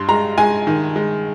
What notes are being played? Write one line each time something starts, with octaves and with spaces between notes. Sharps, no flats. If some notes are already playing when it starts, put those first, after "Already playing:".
Already playing: G2 C6
G#3 A#5
G#3 G#5
D#3
G#3